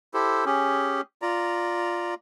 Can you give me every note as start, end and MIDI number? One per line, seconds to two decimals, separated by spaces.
0.14 0.45 64
0.14 0.45 67
0.14 0.45 69
0.14 0.45 72
0.46 1.01 61
0.46 1.01 67
0.46 1.01 68
1.22 2.14 65
1.22 2.14 74
1.22 2.14 82